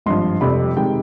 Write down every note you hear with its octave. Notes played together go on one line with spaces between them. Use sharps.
G#1 G2 F3 C6
F1 F2 C3 G3 B5
C3 D#3 G#3 G5